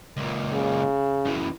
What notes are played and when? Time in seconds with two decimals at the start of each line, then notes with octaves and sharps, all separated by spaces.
0.17 C#2 A#2
0.53 C#3
1.25 F#2 E3